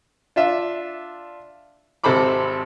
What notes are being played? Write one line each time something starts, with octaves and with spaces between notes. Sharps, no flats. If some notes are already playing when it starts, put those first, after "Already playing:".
D4 F4 E5
G#1 C3 A4 C5 B5 D6